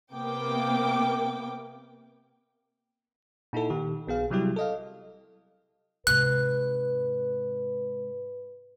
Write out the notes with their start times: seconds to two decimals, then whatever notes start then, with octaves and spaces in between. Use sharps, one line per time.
0.13 C3 A#3 B3 G5 D6
3.53 A#2 D#4 E4 A4
3.70 A#2 D#3 G4
4.07 A#1 B3 G#4 F5
4.30 C3 F#3 G3 E4 G4
4.56 A4 D#5 F5
6.07 G#2 C3 B4 F#6